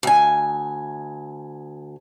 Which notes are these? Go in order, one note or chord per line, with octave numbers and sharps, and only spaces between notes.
D2 G#5